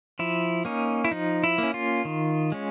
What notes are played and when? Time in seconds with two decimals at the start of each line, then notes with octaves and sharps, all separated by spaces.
0.19 F3 E4
0.65 A#3 C#4 D#4
1.05 E4
1.11 F3 D#4
1.44 E4
1.58 A#3 C#4
1.74 F4
2.05 D#3
2.52 G#3 C#4